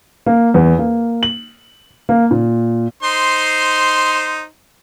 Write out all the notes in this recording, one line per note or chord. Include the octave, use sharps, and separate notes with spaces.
A#3
E2
A#3
F#7
A#3
A#2
D#4 C5 C6